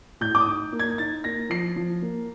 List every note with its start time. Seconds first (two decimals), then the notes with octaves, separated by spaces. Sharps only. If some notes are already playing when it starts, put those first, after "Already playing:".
0.21 A2 G6
0.35 D6
0.40 D#6
0.47 D#4
0.72 A#3
0.79 G#6
0.98 D#4 A6
1.24 A#3 A#6
1.50 F3 C7
1.76 F3
2.02 A#3